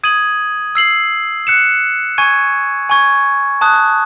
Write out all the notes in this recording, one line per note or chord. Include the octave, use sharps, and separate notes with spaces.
D#6 G#6 D#7 F#7
E6 C7 F#7
F#6 C#7 E7
G#5 C#6 G#6 D#7
G#5 C#6 G#6
A5 D#6 F#6